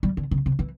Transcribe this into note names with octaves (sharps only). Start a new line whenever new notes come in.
G3
D3
C#3
C3
E3